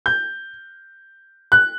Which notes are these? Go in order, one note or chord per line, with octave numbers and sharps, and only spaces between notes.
G6
F#6